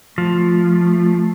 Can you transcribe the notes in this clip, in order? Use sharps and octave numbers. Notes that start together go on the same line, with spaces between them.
F3 A3
A3